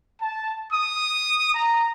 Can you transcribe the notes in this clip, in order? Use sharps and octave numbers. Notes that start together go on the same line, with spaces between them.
A5
D#6
A#5